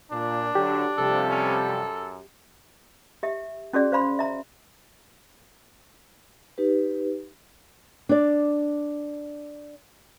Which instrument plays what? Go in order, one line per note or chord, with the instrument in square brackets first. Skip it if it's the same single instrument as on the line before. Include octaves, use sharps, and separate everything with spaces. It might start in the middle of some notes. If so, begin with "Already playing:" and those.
[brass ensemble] A#2 [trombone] D4
[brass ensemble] D3 F#3 [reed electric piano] G4
[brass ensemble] C3 F3 G3 [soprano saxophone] A4
[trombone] C#4
F#2
[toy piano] G4 E5
C#4 F#4 G#4 D5
C5 F5 B5 C6
E5 A#5
[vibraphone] D#4 G4 B4
[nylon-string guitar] D4 D5